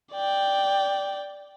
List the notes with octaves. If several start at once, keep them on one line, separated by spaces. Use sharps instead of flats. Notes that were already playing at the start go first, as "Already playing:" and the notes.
D5 G5